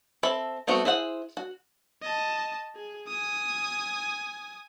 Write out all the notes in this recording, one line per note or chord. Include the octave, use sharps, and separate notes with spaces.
C4 A4 E5 A5 B5
G3 A3 B3 C4 F#4
E4 G#4 C5 F#5
F#4
D#5 A5
G#4
G#5 D#6